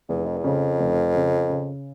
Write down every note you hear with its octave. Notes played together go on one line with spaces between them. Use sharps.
F1 E2
F2
E2
F2 C#3
F1
C#3
C#3